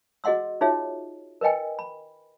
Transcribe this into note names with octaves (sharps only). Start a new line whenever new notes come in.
F#4 G#4 D#5 F#5 C6 E6
D#4 F4 F#4 G#4 C#5 E5
A#4 B4 D#5 G5 G#5
B5